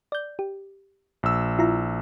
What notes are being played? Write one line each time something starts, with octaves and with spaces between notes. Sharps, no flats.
D5 G6
G4
A#1 E6
E4 F4 A#5